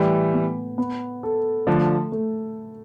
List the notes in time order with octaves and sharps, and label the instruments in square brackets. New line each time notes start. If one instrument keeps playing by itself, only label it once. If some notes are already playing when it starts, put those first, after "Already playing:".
Already playing: [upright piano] A2 [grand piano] E3 G3
[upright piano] B3
B3
A4
[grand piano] D3 F3 [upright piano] A3
[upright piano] A3